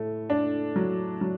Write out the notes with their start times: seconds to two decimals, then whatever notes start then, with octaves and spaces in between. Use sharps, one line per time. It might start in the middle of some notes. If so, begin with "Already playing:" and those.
Already playing: A2 A3
0.30 D4
0.76 F#3
1.21 F#3